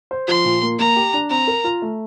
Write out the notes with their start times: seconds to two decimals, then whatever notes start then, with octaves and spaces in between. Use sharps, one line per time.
0.11 C5
0.28 F3 C6
0.45 A#2
0.62 A#3
0.79 A#3 A#5
0.96 G4
1.13 D4
1.30 C4 A#5
1.48 A#4
1.64 F4
1.82 A3